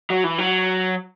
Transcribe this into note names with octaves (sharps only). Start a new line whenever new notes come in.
F#3
E3
F#3